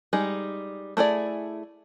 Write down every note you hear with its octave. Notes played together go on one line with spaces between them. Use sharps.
G3 G#3 D#4
A3 E4 G#4 D5